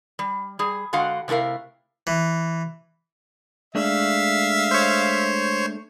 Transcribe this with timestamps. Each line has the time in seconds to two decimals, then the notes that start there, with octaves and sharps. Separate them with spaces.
0.19 G3
0.59 G3 G#4
0.93 D3 G#3 F#4 F5 F#5
1.28 C3 A3 E4 A#4 F5
2.07 E3
3.75 G#3 A3 D4 E5 F5
4.71 C5 C#5